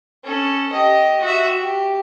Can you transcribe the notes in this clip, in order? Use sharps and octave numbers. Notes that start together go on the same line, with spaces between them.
C#4 A4
G4 D#5
F#4 E5
G4